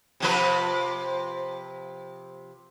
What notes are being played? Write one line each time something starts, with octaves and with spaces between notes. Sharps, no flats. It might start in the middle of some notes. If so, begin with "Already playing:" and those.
C3 F3 B4